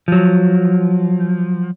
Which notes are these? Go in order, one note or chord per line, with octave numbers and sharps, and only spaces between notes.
F3 F#3